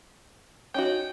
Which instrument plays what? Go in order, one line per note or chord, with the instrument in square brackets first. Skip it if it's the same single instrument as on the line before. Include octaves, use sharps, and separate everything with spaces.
[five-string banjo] C#4 D#4 F#4 [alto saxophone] G5